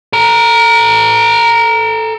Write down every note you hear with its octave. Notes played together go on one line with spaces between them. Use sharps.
A4 A#5